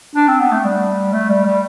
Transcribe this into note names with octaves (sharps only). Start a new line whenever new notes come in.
D4
C4
B3
A3
G3
A3
G3
G3